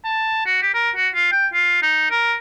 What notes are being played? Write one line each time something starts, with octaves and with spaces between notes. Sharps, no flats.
A5
F#4
G4
A#4
F#4
F4
G5
F4
D#4
A#4